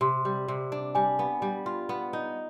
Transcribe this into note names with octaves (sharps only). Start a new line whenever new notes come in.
C3 C6
G3
C3
D4
G3 G#5
B3
G3
F4
B3
D#4